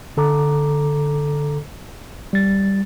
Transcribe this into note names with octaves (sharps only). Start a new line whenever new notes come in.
D3 A4 A#5 D6
G3 A6